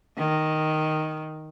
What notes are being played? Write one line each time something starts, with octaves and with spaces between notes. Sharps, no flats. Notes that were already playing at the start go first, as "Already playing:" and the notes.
D#3